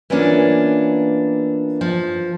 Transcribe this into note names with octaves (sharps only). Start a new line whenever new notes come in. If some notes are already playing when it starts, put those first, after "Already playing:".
E3 A#3 B3 C#4 D4 F4
F3